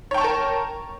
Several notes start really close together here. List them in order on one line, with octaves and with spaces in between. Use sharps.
C#5 G5 C#6 A5 A#4